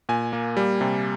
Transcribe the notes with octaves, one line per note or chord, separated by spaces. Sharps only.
A#2 G#5
A#3
G3
C3